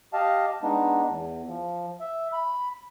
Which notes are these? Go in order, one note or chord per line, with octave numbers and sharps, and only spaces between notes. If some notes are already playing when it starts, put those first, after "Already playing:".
G4 D#5 F5 A5
G#3 B3 D4 D#4
E2
F3
E5
B5